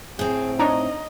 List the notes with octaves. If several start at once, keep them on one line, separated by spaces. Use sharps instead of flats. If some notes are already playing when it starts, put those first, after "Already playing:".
A2 C4 G#4
D4 D#4 C#5 D#5 A#5